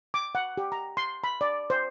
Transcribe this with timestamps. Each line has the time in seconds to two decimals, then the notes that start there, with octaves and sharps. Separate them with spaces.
0.14 D6
0.35 F#5
0.57 G4
0.72 A#5
0.97 C6
1.24 B5
1.41 D5
1.70 C5